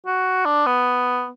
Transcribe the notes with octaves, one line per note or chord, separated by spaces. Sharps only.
F#4
D4
B3